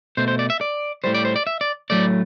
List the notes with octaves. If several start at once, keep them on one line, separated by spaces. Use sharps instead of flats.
B2 A3 C5
C5
D5
E5
D5
A2 G3 C5
D5
C5
D5
E5
D5
A2 F#3 A3 D5